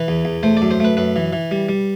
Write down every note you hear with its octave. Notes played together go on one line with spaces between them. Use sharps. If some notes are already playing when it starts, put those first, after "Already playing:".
Already playing: E3 B4
E2
E2
A3 C5
D5
F#2
C5
A3 B4
F#2 B4
E3
E3
G3
G3